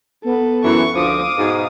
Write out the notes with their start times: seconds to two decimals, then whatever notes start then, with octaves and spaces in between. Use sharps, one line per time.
0.24 B3 A4 B4
0.64 F#2 E3 C#6
0.95 D2 F3 F5 D6 D#6
1.38 G#2 B2